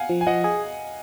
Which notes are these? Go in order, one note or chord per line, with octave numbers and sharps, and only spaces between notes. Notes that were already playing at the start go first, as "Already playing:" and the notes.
Already playing: F5 F#5 G#5
F3
G#5
F3 D#5 F#5
G#4